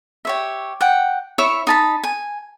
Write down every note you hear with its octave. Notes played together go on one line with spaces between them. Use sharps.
G4 C#5 E5
F#5 G5
E4 C#5 E5 C#6
D#4 A5 B5
G#5